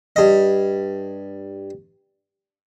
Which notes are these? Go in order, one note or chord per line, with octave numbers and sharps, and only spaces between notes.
G2 D#5